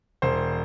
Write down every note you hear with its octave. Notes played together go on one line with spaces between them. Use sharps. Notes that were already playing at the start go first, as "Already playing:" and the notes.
E1 C5